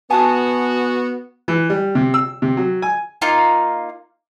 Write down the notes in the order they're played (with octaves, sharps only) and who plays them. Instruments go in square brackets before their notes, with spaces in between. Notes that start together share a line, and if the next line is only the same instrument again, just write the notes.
[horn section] B3 F#4 [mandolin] G#5 A5 D#6
[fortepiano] E3
G3
C3
E6
C3
F#3
G#5
[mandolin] A#3 D#4 F4 F5